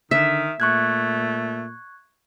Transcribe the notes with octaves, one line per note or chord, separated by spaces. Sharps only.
D3 D#3 E5
A#2 A3 C#6 F#6 G#6